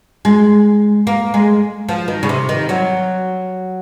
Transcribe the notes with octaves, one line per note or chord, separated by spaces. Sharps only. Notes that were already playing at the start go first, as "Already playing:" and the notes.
G#3
A#3
G#3
F3
D#3
C#3
C3
D#3
F#3